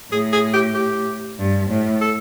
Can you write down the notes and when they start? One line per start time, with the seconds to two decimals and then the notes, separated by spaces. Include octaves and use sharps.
0.11 A2 G#4
0.33 G#4
0.54 G4
0.75 G4
1.39 G2
1.70 A2
2.01 A4